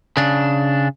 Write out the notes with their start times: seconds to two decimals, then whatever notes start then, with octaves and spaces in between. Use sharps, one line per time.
0.17 C#3 D4